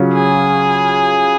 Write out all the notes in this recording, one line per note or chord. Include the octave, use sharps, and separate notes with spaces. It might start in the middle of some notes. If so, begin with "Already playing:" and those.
Already playing: C#3 F#3 C#4 F4
G#4